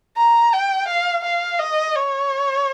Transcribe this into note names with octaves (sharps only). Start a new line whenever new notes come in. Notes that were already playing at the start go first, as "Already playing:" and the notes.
A#5
G5
F5
F5
D#5
C#5